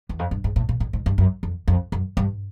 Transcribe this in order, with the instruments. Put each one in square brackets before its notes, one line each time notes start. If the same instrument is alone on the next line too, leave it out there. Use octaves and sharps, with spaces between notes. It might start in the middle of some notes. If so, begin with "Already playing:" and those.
[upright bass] E2
F2
G2
G#2
A2
A#2
A2
G#2
G2
F#2
F2
F2
F#2
G2